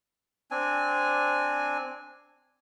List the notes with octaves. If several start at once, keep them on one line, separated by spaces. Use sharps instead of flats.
C4 D4 G#5